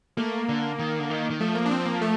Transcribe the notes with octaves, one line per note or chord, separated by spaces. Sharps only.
A3 A#3
D3
D#3
D3
D#3
D#3
F3 A3
A#3
D4
C4
A#3
A3